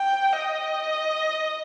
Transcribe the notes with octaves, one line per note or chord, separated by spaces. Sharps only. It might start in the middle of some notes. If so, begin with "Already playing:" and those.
Already playing: G5
D#5